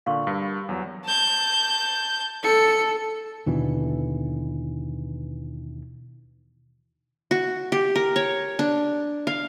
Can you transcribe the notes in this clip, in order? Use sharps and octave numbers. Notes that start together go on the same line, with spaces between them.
A#2 D3 F5 C6 C#6
G2 F#4 A#4
E2 F#3
A5 G6
A4 C#7
D#2 B2 D3 E3
F#4
G4
A#4
C#5
D4
F5